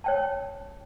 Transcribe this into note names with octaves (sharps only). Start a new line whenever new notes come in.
C#5 G5 A5